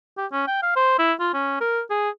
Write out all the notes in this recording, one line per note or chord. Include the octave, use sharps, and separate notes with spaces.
G4
C#4
G5
F5
C5
E4
F4
C#4
A#4
G#4